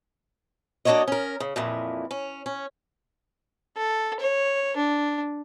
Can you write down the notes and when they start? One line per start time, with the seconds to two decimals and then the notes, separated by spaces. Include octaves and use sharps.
0.85 A#3 D4 E4 F#4 C#5 D#5
1.08 C#4 A#4
1.40 C#3
1.56 F2 A#2 E3
2.11 C#4
2.46 C#4
3.77 A4
4.20 C#5
4.76 D4